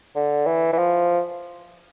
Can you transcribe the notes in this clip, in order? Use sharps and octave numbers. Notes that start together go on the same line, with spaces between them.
D3
E3
E3
F3